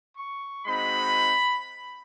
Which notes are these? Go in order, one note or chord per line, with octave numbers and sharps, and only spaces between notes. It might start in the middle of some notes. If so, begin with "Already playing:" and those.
C#6
G#3 C4 D#4 F#4 B5